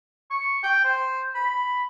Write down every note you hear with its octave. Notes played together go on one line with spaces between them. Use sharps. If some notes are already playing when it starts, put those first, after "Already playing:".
C#6
G5
C5
B5